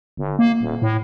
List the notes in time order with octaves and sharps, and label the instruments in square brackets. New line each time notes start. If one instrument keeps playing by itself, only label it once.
[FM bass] G1
A#3
D#1
A2